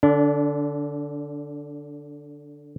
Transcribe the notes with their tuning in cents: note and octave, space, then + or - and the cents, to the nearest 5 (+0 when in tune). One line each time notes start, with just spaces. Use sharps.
D3 +0 D4 -30